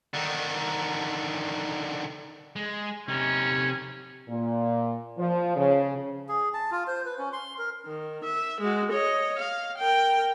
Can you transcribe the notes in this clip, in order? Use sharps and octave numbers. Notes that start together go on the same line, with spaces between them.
D3 D#3
G#3
C3 C#4 D#4
A#2
F3
C#3
G#4
A5
F4
C5
B4
C#4
C6
A#4
D#3
E5
G#3 F#4
C#5 D#5
F5
A#4 G5